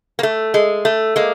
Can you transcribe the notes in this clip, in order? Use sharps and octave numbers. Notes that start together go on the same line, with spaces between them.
A#3
A3
G#3
A3
G#3 A#3